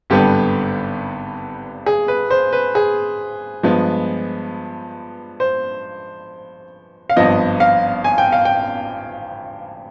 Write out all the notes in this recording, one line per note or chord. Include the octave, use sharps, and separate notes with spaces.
G#1 G2 D3 G3 B3 G4
G#4
B4
C5
B4
G#4
G2 F3 G#3 B3
C5
F5
G#1 G2 F3 B3 D#5
F5
G#5
G5
F5
G5